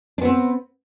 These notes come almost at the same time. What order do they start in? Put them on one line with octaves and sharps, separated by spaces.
D4 B3 C4